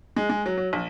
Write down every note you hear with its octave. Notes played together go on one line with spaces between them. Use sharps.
G#3
G#3
F#3
F#3
A#1